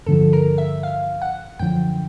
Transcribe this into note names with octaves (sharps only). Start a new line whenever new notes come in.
G2 D3 F3 A4
A#4
E5
F5
F#5
F#2 D3 F3 G5